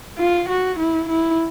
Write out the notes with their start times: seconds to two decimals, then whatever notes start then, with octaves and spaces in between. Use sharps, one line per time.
0.18 F4
0.49 F#4
0.79 E4
1.09 E4